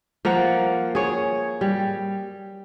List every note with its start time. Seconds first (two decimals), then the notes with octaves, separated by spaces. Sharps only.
0.25 F3 A#3 F5 F#5
0.95 G#4 C#5
1.61 G3